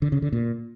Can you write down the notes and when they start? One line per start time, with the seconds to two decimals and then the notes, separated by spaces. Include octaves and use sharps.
0.02 D3
0.12 C#3
0.22 D3
0.32 A#2